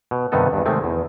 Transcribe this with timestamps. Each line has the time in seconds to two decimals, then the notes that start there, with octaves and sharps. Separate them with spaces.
0.11 B2
0.32 G2 C3 D#3 B3 D#4 A4
0.53 E2 G2
0.65 C3 D#3 G#3 A3 C4
0.84 E2